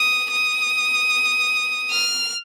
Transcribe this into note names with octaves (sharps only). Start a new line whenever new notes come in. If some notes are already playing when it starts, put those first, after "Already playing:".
Already playing: D#6
D#6
F6